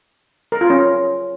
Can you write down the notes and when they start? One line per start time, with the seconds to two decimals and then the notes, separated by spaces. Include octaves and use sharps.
0.52 A#4
0.61 F4
0.70 C#4